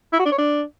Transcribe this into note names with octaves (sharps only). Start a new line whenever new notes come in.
E4
F#4
D4
C#5
D4